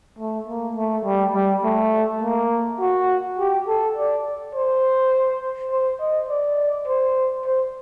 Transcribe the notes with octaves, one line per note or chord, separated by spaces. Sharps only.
A3
A#3
A3
G3
G3
A3
A#3
F#4
G4
A4
D5
C5
C5
D#5
D5
C5
C5